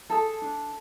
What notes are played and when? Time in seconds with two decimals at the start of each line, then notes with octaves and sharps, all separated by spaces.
0.10 G#4 A4 A5
0.42 D4